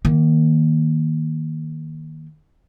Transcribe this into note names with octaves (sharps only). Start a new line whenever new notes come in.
D#3 A#3